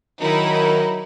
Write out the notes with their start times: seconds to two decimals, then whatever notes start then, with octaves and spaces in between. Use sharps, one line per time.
0.21 D#3 F#3 D#4 E4 A#4